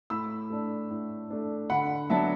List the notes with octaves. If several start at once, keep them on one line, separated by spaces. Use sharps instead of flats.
A2 B5 E6
A3 D4
A2
A3 D4
D3 F#5 B5
F#3 B3 D4 E5 A5